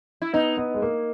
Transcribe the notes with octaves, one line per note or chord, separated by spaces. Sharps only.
E4
B3 D#4
B3
G#3
A#3